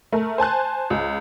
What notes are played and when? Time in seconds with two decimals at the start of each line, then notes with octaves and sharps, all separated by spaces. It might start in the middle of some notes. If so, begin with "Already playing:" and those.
0.12 A3 A#4
0.38 C5 G#5 A5 F#6
0.90 C#2